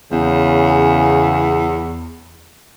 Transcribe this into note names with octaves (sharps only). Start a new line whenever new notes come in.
E2 C#3